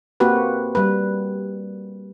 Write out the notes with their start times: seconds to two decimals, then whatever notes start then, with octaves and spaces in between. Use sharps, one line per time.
0.20 A#3 C4 F#4 G4 B4
0.75 G3 B4